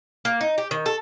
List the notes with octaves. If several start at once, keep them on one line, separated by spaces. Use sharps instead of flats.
A#3
D#4
G4
D#3
A4